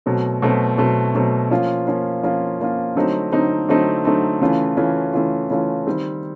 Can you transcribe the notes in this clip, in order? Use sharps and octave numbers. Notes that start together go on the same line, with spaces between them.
B2 F#3 A3 C4
B2 F#3 A3 C4
B2 F#3 A3 C4
B2 F#3 A3 C4
F3 A#3 C#4 F4
F3 A#3 C#4 F4
F3 A#3 C#4 F4
F3 A#3 C#4 F4
D3 F#3 A3 C4 D#4
D3 F#3 A3 C4 D#4
D3 F#3 A3 C4 D#4
D3 F#3 A3 C4 D#4
C#3 E3 A3 C#4 F4
C#3 E3 A3 C#4 F4
C#3 E3 A3 C#4 F4
C#3 E3 A3 C#4 F4
D#3 G3 C4